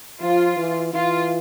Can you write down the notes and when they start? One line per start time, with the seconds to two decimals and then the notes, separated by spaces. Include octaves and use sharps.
0.21 F3 F4
0.57 E3
0.94 E3 F4